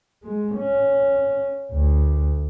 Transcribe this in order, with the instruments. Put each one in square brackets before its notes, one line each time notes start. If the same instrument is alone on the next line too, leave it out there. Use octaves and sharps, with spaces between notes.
[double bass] G#3
C#4
D2